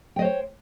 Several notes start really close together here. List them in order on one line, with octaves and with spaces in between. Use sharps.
G5 D#5 C5 C#5